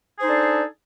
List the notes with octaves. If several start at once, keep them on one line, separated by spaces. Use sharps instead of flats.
D4 D#4 G#4 A4 C5